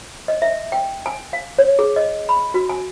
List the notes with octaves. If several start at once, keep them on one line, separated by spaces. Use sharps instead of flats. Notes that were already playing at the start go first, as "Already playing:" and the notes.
D#5
E5
G5
G#5
F5
C#5
G#4
D#5
B5
F#4
G#5